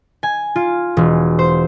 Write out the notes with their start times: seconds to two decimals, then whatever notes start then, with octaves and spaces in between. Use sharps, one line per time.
0.23 G#5
0.56 F4
0.97 E1
1.39 C5